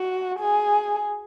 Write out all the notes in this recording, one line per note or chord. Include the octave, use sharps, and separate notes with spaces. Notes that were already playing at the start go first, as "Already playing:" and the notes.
Already playing: F#4
G#4